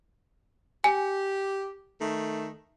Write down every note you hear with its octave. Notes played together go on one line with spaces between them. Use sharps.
G4 G#5
D#3 A3